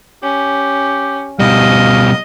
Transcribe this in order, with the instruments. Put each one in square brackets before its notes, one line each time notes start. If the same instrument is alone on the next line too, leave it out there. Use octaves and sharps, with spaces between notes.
[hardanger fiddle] C#4 [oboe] G4
[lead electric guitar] B2 G3 [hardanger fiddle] D#5 [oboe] F5